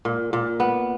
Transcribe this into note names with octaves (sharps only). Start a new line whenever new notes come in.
A#2
A#2
B3